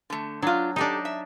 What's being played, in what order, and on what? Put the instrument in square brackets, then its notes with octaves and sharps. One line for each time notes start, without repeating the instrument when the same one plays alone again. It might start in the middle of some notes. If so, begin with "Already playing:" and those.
[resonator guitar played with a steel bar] D3 A3
[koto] F#3 [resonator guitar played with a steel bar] D4 F4
[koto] D4 D#4 [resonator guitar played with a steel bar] G4 A4
[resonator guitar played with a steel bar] E5